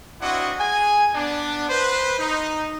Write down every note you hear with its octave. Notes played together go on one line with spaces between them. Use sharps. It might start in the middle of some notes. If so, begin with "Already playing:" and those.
C4 D4 E4 F#4 D#5 F#5
G#4 G#5
B3 D4
B4 C5
D#4